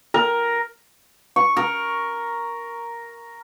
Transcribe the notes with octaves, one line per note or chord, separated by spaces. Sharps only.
A#4
C#6
A#4